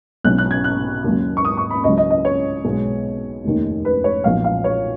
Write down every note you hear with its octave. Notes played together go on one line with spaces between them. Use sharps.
B1 B2 F#3 C#4 F#6
F#6
G#6
F#6
D#2 C#3 F#3
C#6
D#6
C#6
B5
C#2 C#3 F#3 D#5
D#5
D#5
C#5
B1 B2 G#3
F1 D#2 D#3
B4
C#5
B1 A#2 F3 F5
F5
C#5